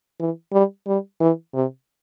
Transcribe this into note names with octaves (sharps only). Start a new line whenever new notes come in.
E3
G3
G3
E3
C3